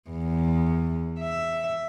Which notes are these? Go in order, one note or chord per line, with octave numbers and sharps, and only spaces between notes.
E2
E5